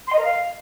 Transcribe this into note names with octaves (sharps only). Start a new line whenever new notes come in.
C6
D#5
A#4
F5